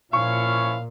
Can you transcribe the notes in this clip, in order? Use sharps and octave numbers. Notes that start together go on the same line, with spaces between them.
A#2 F3 C#4 E4 F5 C#6